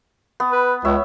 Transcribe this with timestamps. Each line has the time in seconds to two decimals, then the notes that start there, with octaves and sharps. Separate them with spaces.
0.40 B3
0.52 B4
0.85 C#2 C#5 E5